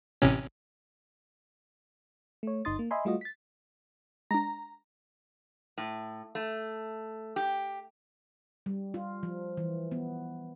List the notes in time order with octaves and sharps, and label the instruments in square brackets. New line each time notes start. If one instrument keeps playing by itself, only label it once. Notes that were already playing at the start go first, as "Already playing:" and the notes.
[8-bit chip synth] A1 C3 C#4
[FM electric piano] A3 C#5
G1 D#4 C6 D#6 A6
A#3
D#5 E5 G#5 B5 C6
G3 A3 F4 F#4 D#5
A6 B6
[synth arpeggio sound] G#3 D4 [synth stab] A#5
[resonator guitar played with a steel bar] A2
A3
G4
[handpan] G3
F4
F3
E3
B3